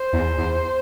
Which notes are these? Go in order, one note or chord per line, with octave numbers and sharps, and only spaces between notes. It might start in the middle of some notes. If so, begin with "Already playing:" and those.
Already playing: C5
E2
E2